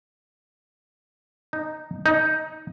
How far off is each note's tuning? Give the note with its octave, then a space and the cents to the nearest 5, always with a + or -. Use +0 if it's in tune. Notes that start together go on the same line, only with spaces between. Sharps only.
D#4 -5
D#4 +10